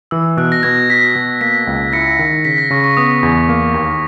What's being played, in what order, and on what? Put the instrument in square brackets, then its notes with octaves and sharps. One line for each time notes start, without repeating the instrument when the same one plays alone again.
[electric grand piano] E3 [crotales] E6
[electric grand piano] B2 [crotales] F#6
[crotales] A#6
[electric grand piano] B2 [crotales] G#6
[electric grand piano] F#4 [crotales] B6
[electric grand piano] B2
[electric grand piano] A#3 [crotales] B6
[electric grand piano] C#2
[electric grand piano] E4 [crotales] A#6 C#7
[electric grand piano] D#3
[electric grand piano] C#3 [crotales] B6
[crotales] A#6
[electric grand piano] C#3 [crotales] C#6
[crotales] C#6
[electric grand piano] B3 [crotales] D#6
[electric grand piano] E2
A#3
D#2